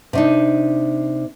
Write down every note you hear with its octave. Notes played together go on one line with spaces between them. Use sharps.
C3 D4 D#4